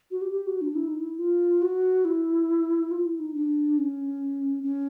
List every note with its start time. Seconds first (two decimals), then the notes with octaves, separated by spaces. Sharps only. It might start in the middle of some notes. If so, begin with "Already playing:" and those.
0.11 F#4
0.21 G4
0.32 G4
0.47 F#4
0.61 D4
0.75 E4
0.87 D#4
0.99 E4
1.19 F4
1.62 F#4
2.05 E4
2.91 F4
3.05 E4
3.19 D#4
3.34 D4
3.78 C#4
4.63 C#4